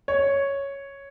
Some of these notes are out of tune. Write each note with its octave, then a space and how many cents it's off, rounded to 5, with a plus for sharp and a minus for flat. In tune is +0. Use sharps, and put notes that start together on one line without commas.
C#5 +0